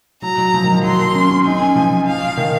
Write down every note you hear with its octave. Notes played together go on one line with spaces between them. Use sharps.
F#3 A#5
F#3
F3
D#3
F3
F#3 C6
A#3
C#4
C#4
D#4 G#5
C#4
F3
F5
D#3